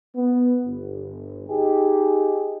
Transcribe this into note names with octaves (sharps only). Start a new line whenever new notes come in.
B3
G1
D#4 G4 G#4